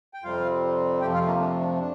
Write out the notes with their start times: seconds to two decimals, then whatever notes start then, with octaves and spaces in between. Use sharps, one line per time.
0.14 G5
0.23 F2 C3 G3 C4 F4 F5
1.01 F2 C3 F3 A3 G4 G5
1.14 F4 F5
1.27 A#3 A#4
1.40 D4
1.60 D4
1.79 D4